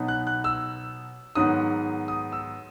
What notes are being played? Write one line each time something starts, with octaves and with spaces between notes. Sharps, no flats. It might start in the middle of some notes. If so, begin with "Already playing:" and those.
Already playing: B2 F#3 B3 D#4
F#6
F#6
E6
G#2 D#3 F#3 B3 D#4 D#6
D#6
E6